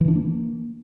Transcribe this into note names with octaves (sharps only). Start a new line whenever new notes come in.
E3
D4
A#3